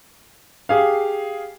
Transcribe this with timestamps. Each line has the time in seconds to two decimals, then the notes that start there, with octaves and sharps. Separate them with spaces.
0.69 G4 G#4 F5